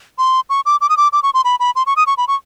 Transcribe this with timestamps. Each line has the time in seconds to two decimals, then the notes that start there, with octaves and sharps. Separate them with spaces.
0.18 C6
0.50 C#6
0.66 D6
0.81 D6
0.89 D#6
0.97 D6
1.13 D6
1.23 C#6
1.34 C6
1.45 B5
1.60 B5
1.76 C6
1.87 C#6
1.96 D#6
2.07 C#6
2.17 B5
2.28 C#6